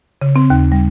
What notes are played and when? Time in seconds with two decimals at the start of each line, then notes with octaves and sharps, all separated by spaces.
0.22 C#3
0.36 C4
0.50 D#2
0.72 G3